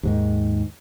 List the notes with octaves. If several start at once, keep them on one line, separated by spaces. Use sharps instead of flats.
D#2 G#2 D#3